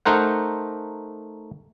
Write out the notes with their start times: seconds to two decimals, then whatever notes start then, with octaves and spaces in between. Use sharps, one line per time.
0.05 A3 D#4 A#4 C5 F#5